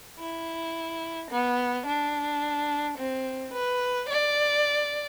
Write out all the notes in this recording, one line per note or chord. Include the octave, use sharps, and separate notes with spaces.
E4
B3
D4
C4
B4
D5